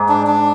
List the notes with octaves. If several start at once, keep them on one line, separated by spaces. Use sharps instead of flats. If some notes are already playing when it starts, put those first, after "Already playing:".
Already playing: G#2
D4
D4